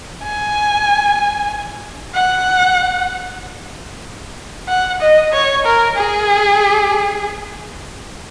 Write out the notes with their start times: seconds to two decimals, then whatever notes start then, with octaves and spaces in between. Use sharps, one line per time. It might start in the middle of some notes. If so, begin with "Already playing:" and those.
0.24 G#5
2.15 F#5
4.68 F#5
5.00 D#5
5.32 C#5
5.65 A#4
5.96 G#4